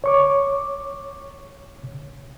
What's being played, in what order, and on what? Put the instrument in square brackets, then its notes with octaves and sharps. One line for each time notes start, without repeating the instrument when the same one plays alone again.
[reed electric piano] C#5 C#6 D6